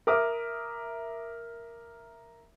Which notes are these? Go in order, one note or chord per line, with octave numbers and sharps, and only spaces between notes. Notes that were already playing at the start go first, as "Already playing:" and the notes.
A#4 E5 D6 D#6